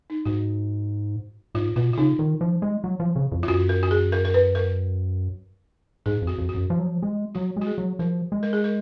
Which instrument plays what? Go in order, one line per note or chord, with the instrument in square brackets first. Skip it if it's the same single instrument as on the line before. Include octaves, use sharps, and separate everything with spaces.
[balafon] D#4
[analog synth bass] G#2 [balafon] F#4
[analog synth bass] G#2 [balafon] F4
[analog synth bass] B2 [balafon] F4
[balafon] F4
[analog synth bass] C#3 [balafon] D#4
[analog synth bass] D#3
F3
G#3
F#3
F3
C#3
F2
[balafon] F4
[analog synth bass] F#2 [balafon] F#4
[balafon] A#4
F#4
G#4
A#4
A#4
B4
A#4
[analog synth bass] G#2 [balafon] G#4
[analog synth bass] F2
[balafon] F#4
[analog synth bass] F2
[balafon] F#4
[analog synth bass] F#2
F3
F#3
F3
G#3
[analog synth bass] F#3 [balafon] F#4
[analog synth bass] G#3 [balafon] F#4
[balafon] G#4
[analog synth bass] F#3
[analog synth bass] F3 [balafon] A#4
[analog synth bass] G#3
[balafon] A#4
G#4
A#4